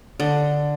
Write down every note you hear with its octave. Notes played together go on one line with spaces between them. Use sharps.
D3